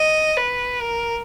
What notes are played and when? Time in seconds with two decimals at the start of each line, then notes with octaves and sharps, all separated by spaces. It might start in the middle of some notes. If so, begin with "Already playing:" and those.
Already playing: D#5
0.37 B4
0.82 A#4